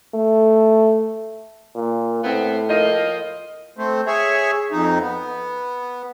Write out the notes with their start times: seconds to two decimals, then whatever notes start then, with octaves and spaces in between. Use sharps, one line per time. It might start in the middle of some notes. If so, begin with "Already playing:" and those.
0.15 A3
1.76 A#2
2.24 A2 B3 C4
2.69 F3 A#3 D#5
3.77 A3 C4
4.07 G#4 C#5 E5
4.72 F2 D#4
5.01 B3